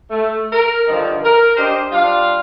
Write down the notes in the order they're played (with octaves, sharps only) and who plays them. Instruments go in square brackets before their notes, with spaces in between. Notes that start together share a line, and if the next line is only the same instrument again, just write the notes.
[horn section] A3
A#4
G2 D3 D#3 F3
A#4
D4 G4 C5 D#5
G3 D4 F4 F5